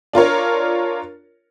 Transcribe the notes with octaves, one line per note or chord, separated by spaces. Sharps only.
D4 F4 A#4 C#5